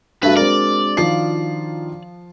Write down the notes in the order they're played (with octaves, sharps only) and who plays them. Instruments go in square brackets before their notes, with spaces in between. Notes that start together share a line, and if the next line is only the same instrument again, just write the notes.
[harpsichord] G2 A3 [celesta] D4 F#4 [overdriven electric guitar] B4
[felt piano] G#3 C4 [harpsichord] A#4 [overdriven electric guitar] D5
[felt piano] D#3 F4 C7 [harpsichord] F3